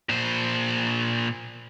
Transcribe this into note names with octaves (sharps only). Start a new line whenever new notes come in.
A#2 C5